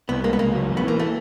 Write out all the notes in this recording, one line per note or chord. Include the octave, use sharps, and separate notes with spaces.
C2 B3
G#3 A#3
B3
C#2 A#3
F#3
A1
B3
E3 A#3
A3